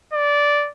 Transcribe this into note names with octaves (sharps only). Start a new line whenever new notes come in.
D5